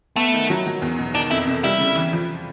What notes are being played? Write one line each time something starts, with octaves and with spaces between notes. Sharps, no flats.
A3 B3
D#3
F#3
F#3
E2
B2
D#3 D4
F2 E4
C3
G3 E4
C#3
E3
F3